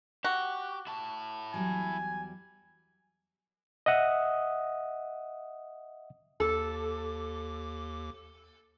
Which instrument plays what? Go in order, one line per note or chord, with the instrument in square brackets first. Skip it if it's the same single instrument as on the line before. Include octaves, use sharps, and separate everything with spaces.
[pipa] F#4 [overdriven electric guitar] G4
[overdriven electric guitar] E4 A5
[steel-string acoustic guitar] E2 F#3 G3 [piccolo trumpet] G#5
[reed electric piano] D#5 E5 F#5 D#6
[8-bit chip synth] D#2 D6 [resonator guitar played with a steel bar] A4